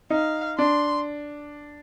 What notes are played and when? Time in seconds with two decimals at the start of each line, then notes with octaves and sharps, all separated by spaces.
0.10 D#4 F5
0.58 D4 C6